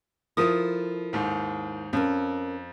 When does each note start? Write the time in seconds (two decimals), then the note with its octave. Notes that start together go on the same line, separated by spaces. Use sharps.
0.37 F3 E4 A4 A#4 D#6
1.13 D#2 G#2
1.93 F2 C#4 A#4